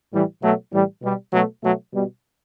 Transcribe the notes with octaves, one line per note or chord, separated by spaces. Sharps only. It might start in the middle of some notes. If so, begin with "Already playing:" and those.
A2 E3 G3
B2 F#3 A3
A2 E3 G3
B2 G3
B2 F#3 A3
B2 F#3 A3
B2 G3